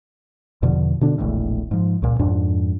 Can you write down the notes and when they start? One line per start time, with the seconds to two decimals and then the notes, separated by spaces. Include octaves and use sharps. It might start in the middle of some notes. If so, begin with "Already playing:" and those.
0.62 E2 B2 D3 F3
1.01 B2 D3 D4
1.18 E1 A#1 E2 A2
1.71 G#2 F3
2.02 C#2 A#2
2.19 F2 G#2 D4